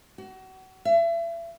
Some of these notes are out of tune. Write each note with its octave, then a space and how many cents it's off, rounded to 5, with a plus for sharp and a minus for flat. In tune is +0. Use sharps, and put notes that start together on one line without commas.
F#4 +30
E5 +35